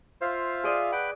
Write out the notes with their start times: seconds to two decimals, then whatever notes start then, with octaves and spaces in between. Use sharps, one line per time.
0.22 F4 C5 E5 F5
0.64 G#4 D5 D#5
0.92 B4 F#5 G5 B5